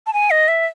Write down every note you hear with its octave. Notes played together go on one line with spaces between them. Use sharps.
A5
G#5
D#5
E5